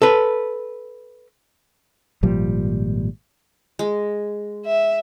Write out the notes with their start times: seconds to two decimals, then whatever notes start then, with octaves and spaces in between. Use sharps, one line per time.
0.02 A4 B4
2.23 G#1 A#2 F3 G3
3.79 G#3
4.66 E5